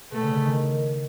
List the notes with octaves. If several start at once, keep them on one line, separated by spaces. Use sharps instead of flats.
B2 A3
C#3
C#3
D#3